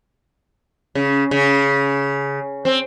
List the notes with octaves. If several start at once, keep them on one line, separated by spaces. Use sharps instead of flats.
C#3
C#3
C4